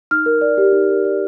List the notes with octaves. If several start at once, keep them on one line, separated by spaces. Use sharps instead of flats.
D#4 F6
A#4
D5
G4
D#4
A#4
D5